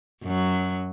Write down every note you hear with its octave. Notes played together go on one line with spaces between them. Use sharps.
F#2 F#3